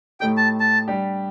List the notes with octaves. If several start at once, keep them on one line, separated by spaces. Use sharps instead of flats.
A2 A3 D#4 G4 G5
A5
A5
G3 D4 G4